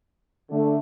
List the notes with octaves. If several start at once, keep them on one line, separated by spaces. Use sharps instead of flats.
D3 A3 D4